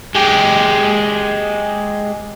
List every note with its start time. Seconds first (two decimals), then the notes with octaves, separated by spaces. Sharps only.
0.15 G#3 G4